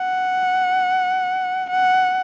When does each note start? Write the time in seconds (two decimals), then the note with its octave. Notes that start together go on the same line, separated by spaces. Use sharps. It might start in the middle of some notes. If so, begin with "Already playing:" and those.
Already playing: F#5
1.70 F#5